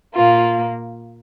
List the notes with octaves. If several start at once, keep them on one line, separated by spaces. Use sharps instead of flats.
A#2 A#3 F4